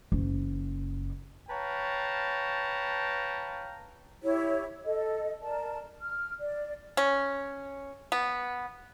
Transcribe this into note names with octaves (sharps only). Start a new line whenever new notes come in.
F#1
B4 C#5 F5 G5 A5 A#5
E4 G4 C#5
A4 D#5
A#4 D5 A5
F6
D5
C#4
B3